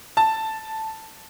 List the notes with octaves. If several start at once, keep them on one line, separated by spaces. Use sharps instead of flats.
A5